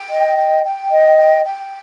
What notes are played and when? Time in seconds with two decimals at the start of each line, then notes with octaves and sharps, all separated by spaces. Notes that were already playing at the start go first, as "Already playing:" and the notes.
Already playing: G5
0.10 D#5
0.36 G5
0.63 G5
0.90 D#5
1.17 G5
1.43 G5